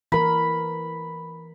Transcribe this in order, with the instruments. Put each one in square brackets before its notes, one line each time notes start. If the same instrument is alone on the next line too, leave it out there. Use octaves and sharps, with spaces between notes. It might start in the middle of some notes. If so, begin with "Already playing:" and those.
[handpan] E3 A#4 [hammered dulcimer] B5